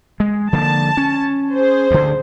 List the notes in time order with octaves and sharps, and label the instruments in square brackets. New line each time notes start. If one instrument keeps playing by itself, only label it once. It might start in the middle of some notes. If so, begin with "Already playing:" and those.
[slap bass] G#3
[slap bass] D3 F3 A#3 [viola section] A5
[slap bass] C#4
[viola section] G#4 C5
[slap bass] D2 D3